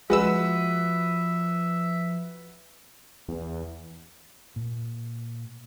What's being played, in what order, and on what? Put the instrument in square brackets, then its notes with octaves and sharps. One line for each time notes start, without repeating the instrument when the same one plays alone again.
[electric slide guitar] F3 [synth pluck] G#3 E6 [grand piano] F#4 B4 [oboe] E5
[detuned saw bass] E2
[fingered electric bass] A#2